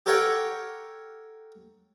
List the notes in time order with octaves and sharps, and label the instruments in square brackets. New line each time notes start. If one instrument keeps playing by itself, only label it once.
[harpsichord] G4 A4 A#4 C#5 F#5 G5